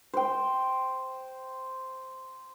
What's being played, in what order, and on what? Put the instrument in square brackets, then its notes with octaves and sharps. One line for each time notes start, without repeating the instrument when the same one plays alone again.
[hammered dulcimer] C5 G5